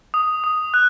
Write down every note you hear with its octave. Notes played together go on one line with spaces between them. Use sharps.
D#6
D#6
F#6